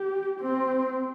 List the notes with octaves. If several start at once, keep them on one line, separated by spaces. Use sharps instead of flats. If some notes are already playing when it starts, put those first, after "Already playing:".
Already playing: G4
C4